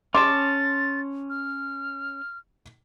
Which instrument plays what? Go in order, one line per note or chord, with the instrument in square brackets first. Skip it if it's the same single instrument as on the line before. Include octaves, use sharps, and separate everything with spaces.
[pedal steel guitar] C#4 A5 [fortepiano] C6 D6 [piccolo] A6
[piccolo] F6